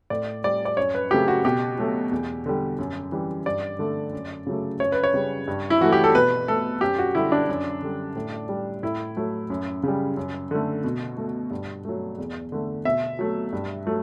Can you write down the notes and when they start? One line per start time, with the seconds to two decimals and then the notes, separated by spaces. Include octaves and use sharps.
0.10 A2 D5
0.44 G3 D5
0.65 D5
0.77 F#2 C#5
0.95 B4
1.11 C#3 F#3 A3 G4
1.28 F#4
1.45 B2 G4
1.78 F#3 A3
2.11 E2
2.46 D3 G3
2.78 F#2
3.12 E3 G3
3.46 G2 D5
3.79 D3 A3
4.13 F#2
4.47 C#3 F#3 A3
4.80 F#2 C#5
4.92 B4
5.04 C#5
5.14 C#3 G3
5.48 G2
5.70 E4
5.81 E3 A3 F#4
5.92 G4
6.04 A4
6.14 B2 B4
6.48 A3 A4
6.81 F#2 G4
6.98 F#4
7.15 D3 G3 E4
7.32 D4
7.49 F#2
7.82 D3 G3
8.16 A2
8.49 G3
8.83 A2 E4
9.17 F#3 A3
9.50 F#2
9.83 C#3 G3
10.17 F#2
10.51 D3 A3
10.84 B2
11.17 A3
11.51 G2
11.85 F#3 A3
12.18 E2
12.52 D3 A3
12.85 B2 E5
13.19 F#3 A3
13.53 G2
13.86 F#3 A3